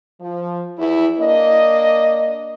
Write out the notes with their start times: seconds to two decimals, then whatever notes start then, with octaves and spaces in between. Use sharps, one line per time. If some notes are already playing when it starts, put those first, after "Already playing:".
0.21 F3
0.78 E2 E4
1.19 A#3 D4 D#5